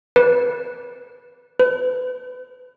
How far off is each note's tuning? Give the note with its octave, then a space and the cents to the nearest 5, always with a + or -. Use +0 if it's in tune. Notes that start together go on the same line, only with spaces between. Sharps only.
B4 -20
B4 +30